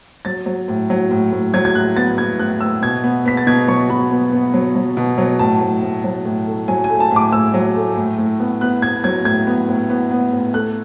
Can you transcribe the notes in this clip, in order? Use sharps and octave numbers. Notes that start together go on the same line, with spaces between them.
F#3 A6
F#3
A2
F#3
A2
A2
F#3 G#6
G#6
A2 F#6
B3 A6
B3 G#6
A2 F#6
A2 E6
B2 G#6
B3
B3 B6
A6
B2 G#6
F#3 C#6
B2 B5
B3
B3
F#3
F#3
B2
F#3
A2 A5
A2
A2
F#3
A2
A3
F#3 G#5
G#5
A3
A5
A2
D6
A2 E6
F#3
A3
A2
A2
B3
B3 F#6
B3 G#6
F#3 G#6
A2 G#6
B3
A2
B3
B3
A2
A3 F#6